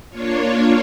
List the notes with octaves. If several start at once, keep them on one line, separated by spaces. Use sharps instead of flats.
A#3 D4 F4 C#5